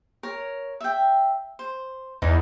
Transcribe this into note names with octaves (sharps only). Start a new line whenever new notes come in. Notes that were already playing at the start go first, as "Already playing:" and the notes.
A#4 C#5
E5 G5
C5
E2 D#4